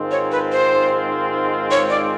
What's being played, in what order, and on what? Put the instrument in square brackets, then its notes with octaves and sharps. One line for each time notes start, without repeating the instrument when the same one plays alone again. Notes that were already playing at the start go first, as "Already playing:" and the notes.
Already playing: [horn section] G#2 D#3 G#3 C4 F4
[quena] C#5
B4
C5
C#5
D5